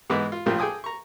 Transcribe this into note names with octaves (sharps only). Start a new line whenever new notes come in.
G#2 E3 G#3 B3 G#4 D6
F4
A#1 A2 F3 F4 G4
G#4 A4 G5 G#5 D6 D#6
A#5 C#6